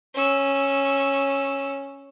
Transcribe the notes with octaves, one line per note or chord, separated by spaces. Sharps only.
C#4 E6